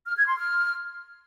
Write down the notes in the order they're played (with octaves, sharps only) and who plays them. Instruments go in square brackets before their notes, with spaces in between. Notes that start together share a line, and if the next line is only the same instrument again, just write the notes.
[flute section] F6
G#6
C6
F6